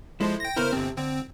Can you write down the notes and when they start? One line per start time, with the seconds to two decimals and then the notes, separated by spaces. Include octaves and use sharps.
0.21 F3 G#3 E4 A4 C5
0.40 G5 A#6
0.57 C#3 B3 E4 A#4 C5 F6
0.73 G1 C3 C4 A5
0.97 D3 C4